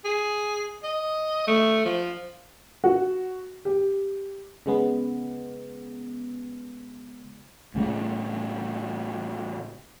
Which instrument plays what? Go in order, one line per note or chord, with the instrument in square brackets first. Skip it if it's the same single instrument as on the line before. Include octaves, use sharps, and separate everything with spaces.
[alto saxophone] G#4
D#5
A3
F3
[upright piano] F#4
G4
[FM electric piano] C#3 G#3 B3
[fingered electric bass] A2 C#3 G#3